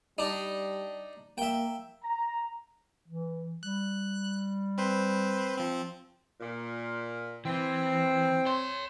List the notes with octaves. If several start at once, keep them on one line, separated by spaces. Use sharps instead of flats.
G3 D4 D#4
A#3 E5 G5
A#5
E3
G3 F#6
C4 B4 C5
F3 C4
A#2
E3 C4
C#5 C6